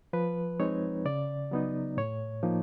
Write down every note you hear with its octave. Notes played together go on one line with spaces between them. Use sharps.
F3 B4
G#3 C4 D#4 C#5
C#3 D5
F#3 B3 D#4
A2 C#5
F3 A#3 D#4